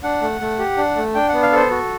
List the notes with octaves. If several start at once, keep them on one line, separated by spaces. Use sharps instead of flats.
D4 F#5
A3
A3
G4
D4
A3
D4 G5
B3 F#5
F5
A4 C5
F#4